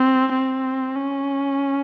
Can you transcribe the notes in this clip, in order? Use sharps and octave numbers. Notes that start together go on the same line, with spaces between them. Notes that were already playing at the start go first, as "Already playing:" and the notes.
Already playing: C4
C4
C#4